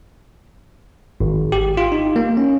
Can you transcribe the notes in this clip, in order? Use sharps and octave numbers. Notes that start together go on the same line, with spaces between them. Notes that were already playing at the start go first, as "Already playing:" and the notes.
G#1
G4
F4
D#4
A#3
C#4